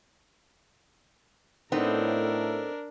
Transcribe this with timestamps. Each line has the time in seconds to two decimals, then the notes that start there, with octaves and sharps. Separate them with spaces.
1.72 A2 B3 C4 D4 D#4 A4 A#4